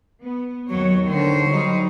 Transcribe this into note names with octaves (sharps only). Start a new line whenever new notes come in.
B3
D#2 F#3 C#5
D3 D#3 C5 C#5
F#3 G3 D#4